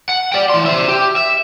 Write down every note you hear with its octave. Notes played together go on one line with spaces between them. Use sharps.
F#5
D5 G5
E3 C6
C5 E5
G4
E5